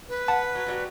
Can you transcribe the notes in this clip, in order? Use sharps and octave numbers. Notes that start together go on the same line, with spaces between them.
B4
F#5 A5
F#3
F#3 G3 F#4